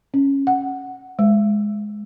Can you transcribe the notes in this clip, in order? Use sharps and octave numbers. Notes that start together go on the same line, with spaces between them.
C#4
F#5
G#3